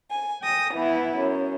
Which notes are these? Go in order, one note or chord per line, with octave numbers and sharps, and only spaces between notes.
G#5
G5 D#6 A#6
E3 B3 E4
F#2